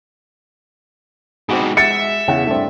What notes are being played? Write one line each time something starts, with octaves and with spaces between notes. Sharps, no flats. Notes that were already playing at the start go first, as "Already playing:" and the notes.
G#2 B2 C4 F#4 G#4 B5 D6
G#3 E5 F#5 A6 C#7
E2 C#3 F#5
G2 A3 C4 D5